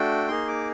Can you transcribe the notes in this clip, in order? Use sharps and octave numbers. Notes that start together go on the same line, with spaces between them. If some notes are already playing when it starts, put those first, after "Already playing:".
Already playing: A3 D4 F#4 A4 G5
A#3 D#4 G#4 C6
D6